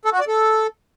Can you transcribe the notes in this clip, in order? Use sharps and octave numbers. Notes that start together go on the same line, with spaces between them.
A4
F#4
D5
A4